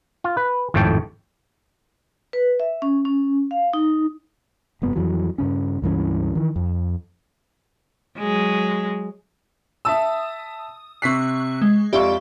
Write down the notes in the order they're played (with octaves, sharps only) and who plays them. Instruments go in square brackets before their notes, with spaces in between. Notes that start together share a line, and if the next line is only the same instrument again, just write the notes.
[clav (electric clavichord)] F4
B4
G#1 F2 A2 C#5 G5 A5
[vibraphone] B4
E5
C#4
C#4
F5
D#4
[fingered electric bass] F1 G2 B3
F2 E3 F#3
G2 C#3 C#4
C#2 G2 E3 C#4
D#3 E3
F2
[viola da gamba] F#3 G#3
[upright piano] E5 A5 E6 [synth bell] D#6
[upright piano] C3 B6 C7 [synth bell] C#6 F#6
[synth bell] G#3
[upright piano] F2 F4 C#6 [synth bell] G4 D5 E5